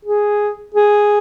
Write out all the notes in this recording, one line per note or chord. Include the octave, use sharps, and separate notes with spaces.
G#4
G#4